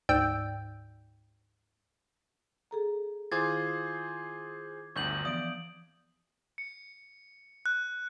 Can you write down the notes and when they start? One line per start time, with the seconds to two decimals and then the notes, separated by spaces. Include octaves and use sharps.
0.09 D2 G#2 D5 G5 E6 G6
2.71 G#4 A4 A#5
3.32 D#3 E4 F4 G#4 C5 D6 G#6 A6
4.96 G1 D2 C#6 G6 F#7
5.25 E3 F3 B3 D5 D#6 D7
6.58 C#7
7.66 F#6